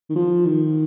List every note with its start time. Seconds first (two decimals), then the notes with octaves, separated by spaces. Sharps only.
0.09 D#3
0.16 F3
0.45 D#3